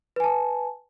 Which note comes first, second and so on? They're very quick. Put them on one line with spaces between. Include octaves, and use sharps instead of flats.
B4 G#5 A5